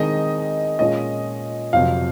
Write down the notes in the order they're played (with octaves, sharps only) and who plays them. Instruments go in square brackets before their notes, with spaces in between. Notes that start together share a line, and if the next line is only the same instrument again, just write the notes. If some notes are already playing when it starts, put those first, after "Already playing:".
Already playing: [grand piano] D#3 G#3 C4 D#4 G#4 [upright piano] D#5
[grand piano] A#2 G#3 C#4 F4 [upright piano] D#5
[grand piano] F2 C3 F#3 C4 [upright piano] F5